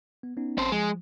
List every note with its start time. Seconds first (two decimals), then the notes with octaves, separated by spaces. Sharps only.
0.23 B3
0.37 B3 C#4 D#4
0.58 A1 C4 C#4 C5 A5
0.72 F3 G#3